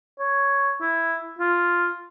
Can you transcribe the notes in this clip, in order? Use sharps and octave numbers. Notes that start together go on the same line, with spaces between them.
C#5
E4
F4